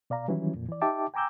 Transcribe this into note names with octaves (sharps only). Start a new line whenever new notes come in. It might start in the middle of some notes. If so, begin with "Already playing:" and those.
B2 D5 F5 A#5
D#3 E3 F#3 G3 C#4 E4
F2 A#2
E3 D5
D#4 G4 E5 G5 A5 D6
G5 G#5 A#5 D6 E6 G6